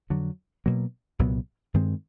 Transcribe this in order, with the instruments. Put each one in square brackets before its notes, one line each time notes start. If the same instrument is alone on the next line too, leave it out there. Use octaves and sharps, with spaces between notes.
[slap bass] F2 D3 F#3
B2 F#3 A#3
C2 A#2 F#3 B3
G2 D#3 G#3 C4